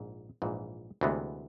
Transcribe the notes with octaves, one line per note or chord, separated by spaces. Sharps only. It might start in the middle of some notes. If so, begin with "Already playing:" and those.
Already playing: A#1 G#2
A#1 G#2 E3
D2 C3 E3 G#3 B3